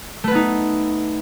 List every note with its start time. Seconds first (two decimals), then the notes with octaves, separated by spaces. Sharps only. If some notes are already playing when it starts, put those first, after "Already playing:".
0.24 A3
0.28 B4
0.31 B3
0.35 D#4